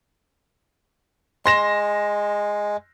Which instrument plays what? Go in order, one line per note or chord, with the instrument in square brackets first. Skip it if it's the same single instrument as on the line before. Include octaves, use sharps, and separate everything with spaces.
[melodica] G#3 [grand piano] C6 A#6 E7